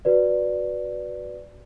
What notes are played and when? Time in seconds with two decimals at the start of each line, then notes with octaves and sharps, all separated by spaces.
0.05 F#4 B4 D5